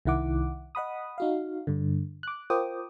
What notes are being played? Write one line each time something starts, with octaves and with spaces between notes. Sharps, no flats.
C2 D#3 E4 F#5 D6
D#5 F#5 B5 D#6
D#4 F#4 F5
G2 D3
D6 F#6
F4 A#4 C5 G5 D6 D#6